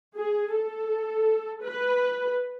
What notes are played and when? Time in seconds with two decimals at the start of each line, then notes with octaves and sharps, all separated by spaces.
0.17 G#4
0.53 A4
1.63 B4